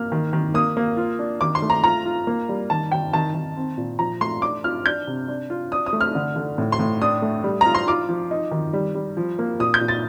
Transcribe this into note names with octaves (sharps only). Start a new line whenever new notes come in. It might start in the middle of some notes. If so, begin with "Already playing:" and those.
Already playing: A#3 F6
D#3
D#3
A#3 D#6
A#3
F4
D4
D#3 D6
C6
A3
A#5
F4 A#5
F4
A#3
G3
D#3 A5
D#3 G5
D#3 A5
D#3
C4
A#2
F3 A#5
A3 C6
D4 D6
F4 F6
D4 G6
C3
D4
F4
D4 D#6
D#6
A3
F6
D3
D3
A2
C6
A2
D4 D#6
A3
G3
F4 A#5
C6
F4 D6
F3
D#4
D#3
G3
G3
F3
A#3
A#2 D#6
G6
A#2
A6